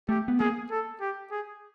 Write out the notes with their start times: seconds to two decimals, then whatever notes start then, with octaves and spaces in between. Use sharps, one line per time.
0.09 A3 G4
0.28 B3
0.40 A#3 G#4
0.71 A4
1.01 G4
1.31 G#4